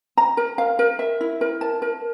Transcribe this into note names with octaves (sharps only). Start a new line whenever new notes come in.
A#5
A#4
F5
A#4
E5
E4
A#4
A5
A#4